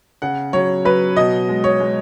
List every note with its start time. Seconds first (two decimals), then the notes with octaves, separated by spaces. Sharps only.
0.22 C#3 F#5
0.53 F#3 C#5
0.85 F#3 B4
1.16 B2 D#5
1.49 G#3
1.64 C#5
1.80 G#3